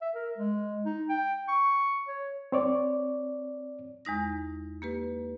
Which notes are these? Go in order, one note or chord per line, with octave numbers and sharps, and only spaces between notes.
E5
A#4
G#3
D#4
G5
C#6
C#5
C4 C#5 D5
E2 G#3 D#4 A#6
A#3 G4 B4